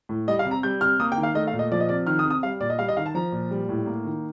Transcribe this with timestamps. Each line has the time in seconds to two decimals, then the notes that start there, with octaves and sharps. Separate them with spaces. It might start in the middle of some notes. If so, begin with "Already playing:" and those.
0.09 A2
0.27 G3 D#5
0.39 F5
0.45 C3
0.51 A#5
0.63 G3 G6
0.81 C3 F6
1.00 A#3 D#6
1.12 G5
1.18 D#3
1.23 F5
1.35 A3 D#5
1.47 F5
1.53 A#2
1.59 D#5
1.72 F3 D5
1.80 D#5
1.89 C3 D5
2.07 D#3 F6
2.19 D#6
2.25 C3
2.30 D#6
2.43 G3 F5
2.60 A#2 D5
2.70 D#5
2.79 G3 F5
2.88 D#5
2.97 D#3 F5
3.06 A5
3.15 F3 A#5
3.32 A#2
3.51 G3
3.69 A2
3.86 A#3
4.05 D#3